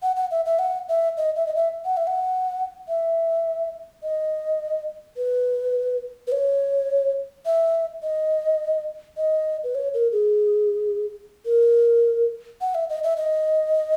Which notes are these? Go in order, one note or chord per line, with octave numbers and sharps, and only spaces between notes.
F#5
F#5
E5
E5
F#5
E5
D#5
E5
D#5
E5
F#5
E5
F#5
E5
D#5
B4
B4
C#5
E5
D#5
D#5
B4
C#5
A#4
G#4
A#4
F#5
E5
D#5
E5
D#5